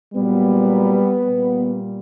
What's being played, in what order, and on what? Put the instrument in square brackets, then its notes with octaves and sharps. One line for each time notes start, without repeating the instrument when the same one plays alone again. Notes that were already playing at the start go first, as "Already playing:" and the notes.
[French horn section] A#2 F#3 G3 B3
A#2 G3